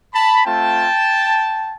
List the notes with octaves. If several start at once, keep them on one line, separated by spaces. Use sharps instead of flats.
A5 B5
A3 C4 F4 G5 A5